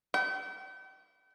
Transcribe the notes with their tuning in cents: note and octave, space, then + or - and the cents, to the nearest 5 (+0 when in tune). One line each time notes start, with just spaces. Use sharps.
G5 -40